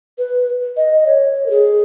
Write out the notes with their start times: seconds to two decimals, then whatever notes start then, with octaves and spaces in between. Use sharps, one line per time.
0.18 B4
0.77 D#5
1.06 C#5
1.46 A#4
1.50 G#4